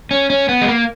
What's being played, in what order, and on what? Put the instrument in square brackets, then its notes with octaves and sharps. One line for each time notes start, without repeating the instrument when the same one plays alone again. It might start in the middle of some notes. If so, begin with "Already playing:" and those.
[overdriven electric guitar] C#4
C#4
B3
G#3
A#3